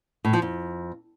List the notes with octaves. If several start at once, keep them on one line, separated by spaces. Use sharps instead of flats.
A2
F3
F2